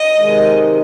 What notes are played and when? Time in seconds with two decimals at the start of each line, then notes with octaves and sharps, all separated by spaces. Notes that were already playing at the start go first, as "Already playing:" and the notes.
Already playing: D#5
0.17 C3 D#3 G#3